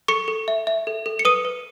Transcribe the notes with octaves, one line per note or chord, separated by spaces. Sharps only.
A4 C#6 C#7
A4
E5
E5
A4
A4
C#7
B4 D#6 D#7
B4